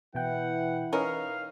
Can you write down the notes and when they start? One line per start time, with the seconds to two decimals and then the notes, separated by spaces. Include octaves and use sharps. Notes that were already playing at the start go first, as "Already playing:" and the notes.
0.15 B2 E3 E4 F#5 G5
0.93 C#4 D#4 A#4 B4 D#5 F5